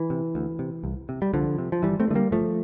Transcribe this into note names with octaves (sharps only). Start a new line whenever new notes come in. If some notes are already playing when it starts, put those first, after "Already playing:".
Already playing: E3
C3
D2
C3
C2
C3
G3
C2 D3 F3
C3
F3
G1 E3 G3
A3 C4
G2
D3 G3 A3 A#3
G1 F3 A3